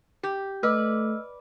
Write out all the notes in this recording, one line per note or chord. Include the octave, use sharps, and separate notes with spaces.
G4
A3 B4 D5 D#5 E6 F6